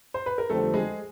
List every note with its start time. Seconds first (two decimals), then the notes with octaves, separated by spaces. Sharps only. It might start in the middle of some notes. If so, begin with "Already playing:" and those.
0.14 C5
0.26 B4
0.38 A#4
0.50 F2 D3 G3 A3 C4 A4
0.74 G#3 G#4